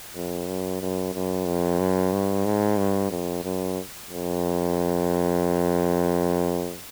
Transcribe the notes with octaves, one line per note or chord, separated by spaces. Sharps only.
F2
F#2
F#2
F#2
F2
F#2
G2
G#2
G2
F2
F#2
F2